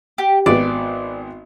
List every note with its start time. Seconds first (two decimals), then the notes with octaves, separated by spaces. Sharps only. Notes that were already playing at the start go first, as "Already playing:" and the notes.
0.18 G4
0.46 G#1 B3 D5